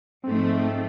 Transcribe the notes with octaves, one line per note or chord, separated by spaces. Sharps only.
G#2 F3 A3 C4